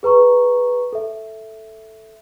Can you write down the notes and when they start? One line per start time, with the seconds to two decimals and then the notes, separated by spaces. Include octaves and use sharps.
0.03 G#4 B4 A#5 C#6
0.93 A4 E5